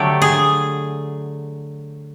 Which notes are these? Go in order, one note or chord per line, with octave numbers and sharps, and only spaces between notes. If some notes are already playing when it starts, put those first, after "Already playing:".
Already playing: D3 F#3 A3 G4
G#4